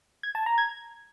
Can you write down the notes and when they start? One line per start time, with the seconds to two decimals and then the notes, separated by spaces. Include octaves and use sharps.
0.23 G#6
0.35 A5
0.46 A#5
0.58 G#6